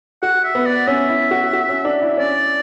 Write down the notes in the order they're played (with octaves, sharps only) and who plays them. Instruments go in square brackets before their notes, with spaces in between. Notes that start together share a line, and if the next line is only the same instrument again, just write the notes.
[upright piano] F#4 [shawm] F#5
[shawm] E5
[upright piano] B3
[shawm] D5
[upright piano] C#4 [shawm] E5
[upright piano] E4
F#4
F#4
C#4
D4
E4
[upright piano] C#4 [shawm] D5